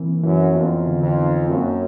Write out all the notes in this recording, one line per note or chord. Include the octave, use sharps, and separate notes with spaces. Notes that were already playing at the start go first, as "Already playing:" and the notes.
Already playing: E3 A#3 C4 A#4
F#2 E3
F2 B3
D3
F2
D#4
F#2 A#3